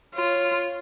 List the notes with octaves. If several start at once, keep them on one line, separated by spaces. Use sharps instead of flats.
F4 C#5